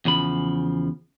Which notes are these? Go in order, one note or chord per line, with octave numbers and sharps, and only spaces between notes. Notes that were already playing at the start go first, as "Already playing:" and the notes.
E2 C#3 F3 B5